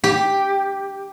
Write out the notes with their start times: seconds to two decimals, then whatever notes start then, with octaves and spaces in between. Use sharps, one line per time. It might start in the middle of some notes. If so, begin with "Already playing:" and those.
0.04 G4